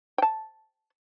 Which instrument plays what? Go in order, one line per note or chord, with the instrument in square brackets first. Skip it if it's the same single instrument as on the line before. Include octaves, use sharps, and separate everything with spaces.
[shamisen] G5 A5